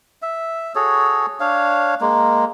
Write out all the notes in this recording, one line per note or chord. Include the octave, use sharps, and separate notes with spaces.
E5
F#4 G#4 A4 C#5
D4 C#5 F5
G#3 A#3